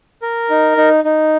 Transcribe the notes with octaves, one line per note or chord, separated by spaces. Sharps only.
A#4
D#4
D#4
D#4